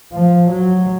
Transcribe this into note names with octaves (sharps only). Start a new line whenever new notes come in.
F3
F#3